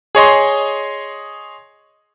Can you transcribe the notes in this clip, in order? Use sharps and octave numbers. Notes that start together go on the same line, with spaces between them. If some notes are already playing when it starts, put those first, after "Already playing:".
G#4 C#5 D#5 C6